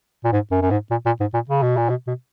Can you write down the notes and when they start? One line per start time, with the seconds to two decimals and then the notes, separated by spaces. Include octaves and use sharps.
0.24 A#2
0.33 G#2
0.51 F#2
0.62 F#2
0.71 G#2
0.91 A#2
1.06 A#2
1.20 G#2
1.34 A#2
1.49 C#3
1.63 B2
1.77 A#2
1.89 B2
2.07 B2